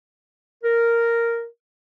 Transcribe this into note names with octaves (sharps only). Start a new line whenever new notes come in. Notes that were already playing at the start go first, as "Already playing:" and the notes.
A#4